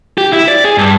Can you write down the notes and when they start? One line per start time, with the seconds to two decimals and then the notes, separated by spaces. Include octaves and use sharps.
0.18 G4
0.33 E4
0.48 D5
0.64 G#4
0.78 G2